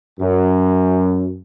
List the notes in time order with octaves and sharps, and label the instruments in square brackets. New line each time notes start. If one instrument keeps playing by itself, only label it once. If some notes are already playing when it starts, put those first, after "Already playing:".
[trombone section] F#2